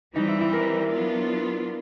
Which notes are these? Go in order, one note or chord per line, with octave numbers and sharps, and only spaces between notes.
E3 G3 C4 D#4
E4
E4
A#4
F#3 B3 D4 F4